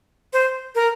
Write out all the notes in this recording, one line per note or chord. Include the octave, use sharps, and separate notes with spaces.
C5
A#4